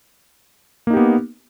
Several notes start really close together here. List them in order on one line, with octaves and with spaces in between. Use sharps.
A#3 D#4 G4 B3